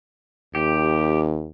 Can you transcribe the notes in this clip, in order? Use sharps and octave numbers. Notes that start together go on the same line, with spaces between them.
D#2 G4